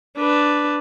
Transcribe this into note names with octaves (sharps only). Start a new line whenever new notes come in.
D4 B4